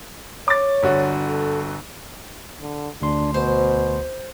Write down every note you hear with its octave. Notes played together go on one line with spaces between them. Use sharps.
C#5 D6 A6
G1 D3 F#4
A4
D3
D2 D4 C6
B2 C5